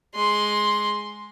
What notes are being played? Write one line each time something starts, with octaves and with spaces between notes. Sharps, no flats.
G#3 C6